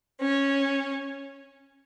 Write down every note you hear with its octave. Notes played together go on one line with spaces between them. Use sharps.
C#4